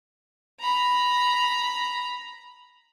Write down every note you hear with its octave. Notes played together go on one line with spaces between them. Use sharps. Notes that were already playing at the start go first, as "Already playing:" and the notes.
A#5 B5